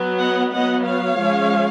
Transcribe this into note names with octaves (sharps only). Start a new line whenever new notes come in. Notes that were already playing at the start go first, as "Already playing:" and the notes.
Already playing: F#3 B3
D#5 F#5
F#3 B3 D#5 F#5
C#5 F5
F3 G#3 C#4